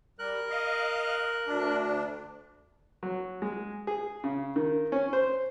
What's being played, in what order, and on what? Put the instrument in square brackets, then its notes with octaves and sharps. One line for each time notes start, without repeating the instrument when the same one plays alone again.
[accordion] G3 [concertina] A#4 F#6
[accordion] D#5 F5
D2 D4
[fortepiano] F#3
G#3
G#4
C#3
D#3
C#4
C5